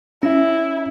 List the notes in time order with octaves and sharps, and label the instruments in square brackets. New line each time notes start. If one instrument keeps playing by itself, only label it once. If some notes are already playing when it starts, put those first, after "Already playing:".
[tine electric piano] C#4 [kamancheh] E4